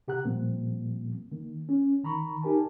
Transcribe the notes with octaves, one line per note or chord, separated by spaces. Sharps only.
C3 G4 F#5 A#5 F#6
A#2 F3 G3 A#3 C4
D#3 A#3
C#4
D#3 A#5 B5 C#6
D#4 G4 A#4 G#5 A5